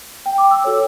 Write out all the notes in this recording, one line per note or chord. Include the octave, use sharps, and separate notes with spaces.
G5
D6
E6
F#4 A4 C#5